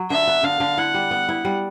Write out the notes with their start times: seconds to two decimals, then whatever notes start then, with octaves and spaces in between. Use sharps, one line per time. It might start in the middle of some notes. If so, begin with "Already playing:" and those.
Already playing: F#3
0.10 D3 E5
0.27 B3
0.43 D3 F5
0.60 D3
0.78 E4 F#5
0.94 G3
1.11 B3
1.29 E4
1.45 G3